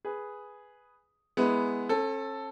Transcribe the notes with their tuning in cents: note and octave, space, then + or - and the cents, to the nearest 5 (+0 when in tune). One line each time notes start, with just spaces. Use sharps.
G#4 +0 B4 +0
G#3 +0 B3 +0 E4 -10
C#4 -45 A4 +0